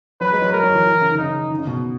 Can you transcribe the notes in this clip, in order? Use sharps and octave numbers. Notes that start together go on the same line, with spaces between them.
F#3 B4
G#3
F#3
G#3 A#4
F#3
E3
E3
C#3
D#3
C#3 D#4
D#3
C#3
B2